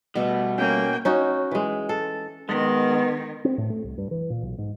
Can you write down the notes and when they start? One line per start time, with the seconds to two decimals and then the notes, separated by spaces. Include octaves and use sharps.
0.15 B2 G3 A3 F#4 A4
0.58 A#3 C#4 G5
1.05 C#4 D#4 F#4
1.51 E3 G#3
1.89 A4
2.49 D#3 G#3 B3
3.45 C4
3.58 A2
3.70 A3
3.84 C2
3.98 G2
4.11 E3
4.30 A#2
4.43 B1
4.58 G#2